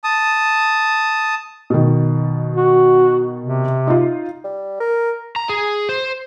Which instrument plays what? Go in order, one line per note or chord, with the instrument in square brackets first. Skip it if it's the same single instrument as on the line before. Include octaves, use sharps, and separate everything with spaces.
[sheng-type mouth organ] A5 D#6
[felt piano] B2 D#3
[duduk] F#4
C3
[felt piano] D#4 F4
[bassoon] G3
A#4
[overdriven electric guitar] A#5
G#4
C5